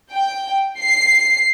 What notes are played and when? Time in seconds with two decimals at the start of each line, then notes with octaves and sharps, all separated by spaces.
0.11 G5
0.79 C7